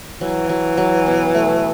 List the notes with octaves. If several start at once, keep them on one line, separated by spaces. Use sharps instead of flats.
E3 F#3
F#3
F#3
B2
A3